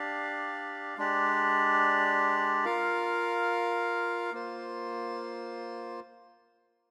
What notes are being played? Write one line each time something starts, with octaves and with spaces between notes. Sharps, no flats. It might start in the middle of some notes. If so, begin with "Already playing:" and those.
Already playing: D4 G4 D5 F5
G#3 D4 G4 D5
F4 A#4 F5
A#3 F4 C5